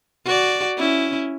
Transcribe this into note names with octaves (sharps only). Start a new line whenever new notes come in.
F#4 D5
C#4 E4